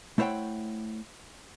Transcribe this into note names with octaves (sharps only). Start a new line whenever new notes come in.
A3 E4 C5 C#5 F#5 G5